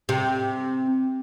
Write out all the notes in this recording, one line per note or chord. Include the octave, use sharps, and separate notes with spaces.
C3